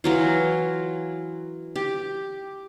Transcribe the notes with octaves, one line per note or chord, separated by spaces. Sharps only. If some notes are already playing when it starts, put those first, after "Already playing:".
E3 F#3 F4
G4